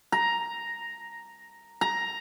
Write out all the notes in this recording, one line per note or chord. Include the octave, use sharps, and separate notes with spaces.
A#5
A#5